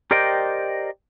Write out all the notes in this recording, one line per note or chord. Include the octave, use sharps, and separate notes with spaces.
G4 A#4 C5 D5 D#5 G5